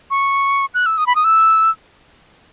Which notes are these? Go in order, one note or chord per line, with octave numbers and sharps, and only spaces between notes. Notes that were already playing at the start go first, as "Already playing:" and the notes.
C#6
F#6
E6
D#6
B5
D#6
E6